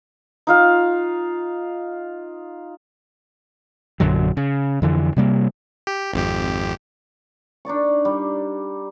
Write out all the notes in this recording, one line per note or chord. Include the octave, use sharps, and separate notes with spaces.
D#4 F4 F5
A#1 F#2 D3 F#3
C#3
F2 D3 E3
C3 G3 A#3
G4
G#1 F2 G4
D4 D#4 D5 C#6
G3